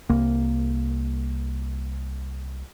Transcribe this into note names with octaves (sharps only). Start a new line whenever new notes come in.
C2 A#3